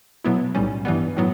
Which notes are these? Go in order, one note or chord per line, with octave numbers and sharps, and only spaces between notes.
B2 F#3 B3 E4
B1 A2 G3 C#4
G2 E3 G3 B3
A2 F#3 B3